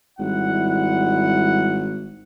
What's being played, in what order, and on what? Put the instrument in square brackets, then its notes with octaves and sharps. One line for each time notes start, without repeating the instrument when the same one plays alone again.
[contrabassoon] G#1 [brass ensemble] G3 E4 F#5